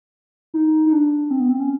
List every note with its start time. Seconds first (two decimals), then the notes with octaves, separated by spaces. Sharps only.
0.54 D#4
0.86 D#4
0.93 D4
1.31 C4
1.40 B3
1.50 C4
1.60 C#4